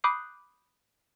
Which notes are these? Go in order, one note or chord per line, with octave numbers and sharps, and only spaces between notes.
B5 D6 D#6 F#6 G6 C7